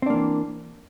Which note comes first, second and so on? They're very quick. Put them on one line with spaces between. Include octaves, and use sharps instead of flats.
C4 D4 A#3 E3